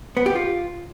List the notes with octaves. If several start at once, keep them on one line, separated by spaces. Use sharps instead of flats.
B3
G4
F4